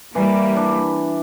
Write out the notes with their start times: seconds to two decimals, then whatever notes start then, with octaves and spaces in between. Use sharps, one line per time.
0.15 E3 G3 A#3
0.56 D4